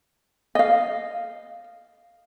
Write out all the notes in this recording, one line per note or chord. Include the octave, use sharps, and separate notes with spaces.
D#5 F5